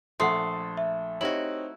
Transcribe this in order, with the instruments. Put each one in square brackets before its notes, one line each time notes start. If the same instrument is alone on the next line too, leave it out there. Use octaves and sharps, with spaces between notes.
[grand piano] A#1 F#5 [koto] A3 [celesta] C6 D#6 C7
[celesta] E5
[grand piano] C4 D#4 C#5 [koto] E4 F#4 [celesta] G4 F#7